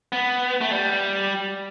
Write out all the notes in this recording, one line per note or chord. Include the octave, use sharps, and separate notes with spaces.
B3
A3
G3